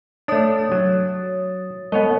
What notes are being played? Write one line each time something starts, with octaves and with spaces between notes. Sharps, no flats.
A3 D4 C#5 D#6 A6
F#3
G#3 B3 C#5 D#5